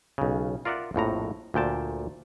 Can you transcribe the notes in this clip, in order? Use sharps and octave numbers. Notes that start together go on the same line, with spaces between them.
B1 C#3
F4 A#4 D5 E5 F#5
A#1 F2 A2 A#5
D2 A#2 G5 A5